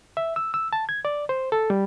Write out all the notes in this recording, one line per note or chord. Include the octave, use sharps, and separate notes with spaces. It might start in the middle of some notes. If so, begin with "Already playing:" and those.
E5
E6
E6
A5
G#6
D5
C5
A4
G3